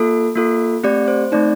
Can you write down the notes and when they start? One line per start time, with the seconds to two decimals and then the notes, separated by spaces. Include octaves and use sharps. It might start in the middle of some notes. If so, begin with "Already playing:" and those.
Already playing: A#3 F4 A4
0.35 A#3 F4 A4
0.84 A3 C4 G4 D5
1.08 C5
1.32 A3 C4 D#4 D5